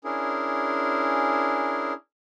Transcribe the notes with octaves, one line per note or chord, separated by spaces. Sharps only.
C#4 D4 E4 G#4 A#4